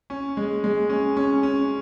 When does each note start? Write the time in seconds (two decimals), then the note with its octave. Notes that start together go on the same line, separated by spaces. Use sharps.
0.10 C#4
0.37 G#3
0.64 G#3
0.90 C#4
1.17 C#4
1.43 C#4